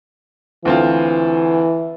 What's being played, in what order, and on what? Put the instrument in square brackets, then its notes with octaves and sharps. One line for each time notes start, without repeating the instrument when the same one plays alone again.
[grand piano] D2 C4 F4 [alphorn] E3